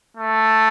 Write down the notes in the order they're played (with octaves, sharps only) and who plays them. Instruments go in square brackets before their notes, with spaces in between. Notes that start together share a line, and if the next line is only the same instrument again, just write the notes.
[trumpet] A3